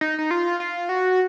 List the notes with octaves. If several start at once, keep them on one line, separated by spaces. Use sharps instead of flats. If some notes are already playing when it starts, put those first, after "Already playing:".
D#4
D#4
F4
F4
F#4